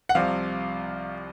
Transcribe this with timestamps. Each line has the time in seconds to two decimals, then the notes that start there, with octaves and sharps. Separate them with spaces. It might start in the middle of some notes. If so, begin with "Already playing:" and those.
0.09 F#5
0.15 C2 C3 F3 F5